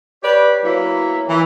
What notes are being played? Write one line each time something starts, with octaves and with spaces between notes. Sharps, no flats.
G4 B4 C#5 D5
F#3 A#3 B3 E4
E3